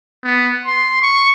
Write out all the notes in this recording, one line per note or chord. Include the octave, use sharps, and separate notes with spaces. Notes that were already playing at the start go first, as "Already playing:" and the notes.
B3
C6
C#6